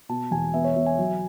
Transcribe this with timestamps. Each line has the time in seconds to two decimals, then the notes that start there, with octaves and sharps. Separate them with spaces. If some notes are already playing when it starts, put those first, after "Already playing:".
0.09 B2 A5
0.31 E1 G#5
0.54 B3 E5
0.64 C#5
0.76 B2 E5
0.87 G#5
0.98 F#3